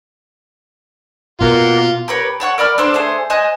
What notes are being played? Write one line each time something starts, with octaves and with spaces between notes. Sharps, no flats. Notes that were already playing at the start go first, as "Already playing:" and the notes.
B2 A#3 F4 A#4 F#5
G4 A#4 B4 C#5
A4 C#5 F#5 C#6
A#4 D5 B5 F6
D4 A4 C5
A3 G#4 C5
C5 D#5 G#5 F#6